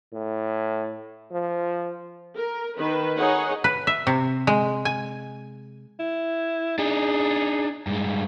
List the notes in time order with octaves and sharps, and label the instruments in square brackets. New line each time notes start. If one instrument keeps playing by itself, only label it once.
[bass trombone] A2
F3
[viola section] A#4
D#3 B4
D#4 G#4 C#5 D#5 F#5
[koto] B4
E5
C3
G#3
G#5
[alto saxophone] E4
[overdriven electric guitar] D4 D#4 [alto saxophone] G#4
[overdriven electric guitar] G2 G#3